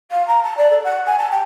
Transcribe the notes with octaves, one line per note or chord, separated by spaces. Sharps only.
F5
A#5
A5
D5
A4
F#5
G#5
A5
G5